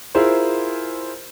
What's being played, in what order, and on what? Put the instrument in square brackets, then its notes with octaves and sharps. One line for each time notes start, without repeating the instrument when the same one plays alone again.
[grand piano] E4 F4 G#4 A#4 C5